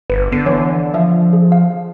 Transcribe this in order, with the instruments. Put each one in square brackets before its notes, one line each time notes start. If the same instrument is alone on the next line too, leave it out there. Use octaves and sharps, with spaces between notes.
[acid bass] G1 [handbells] B4
[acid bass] D3 [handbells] B3 C7
[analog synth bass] E3 [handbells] C#5
[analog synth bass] F3 [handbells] E5
[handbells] G#4
F5